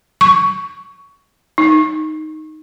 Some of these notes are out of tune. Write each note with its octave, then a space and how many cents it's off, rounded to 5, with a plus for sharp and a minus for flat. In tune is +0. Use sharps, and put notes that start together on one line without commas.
C#6 +15
D#4 +0